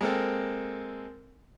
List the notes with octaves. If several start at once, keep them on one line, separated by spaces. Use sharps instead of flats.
G#3 A#3 C4 A4